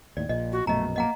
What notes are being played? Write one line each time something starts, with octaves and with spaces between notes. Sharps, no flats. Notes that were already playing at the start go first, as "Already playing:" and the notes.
D#2 A2 D5
A#1 A#2 D#5
F#4
A#1 F#2 B2 A3 D#5 A#5
A#3 D#5 F#5 A#5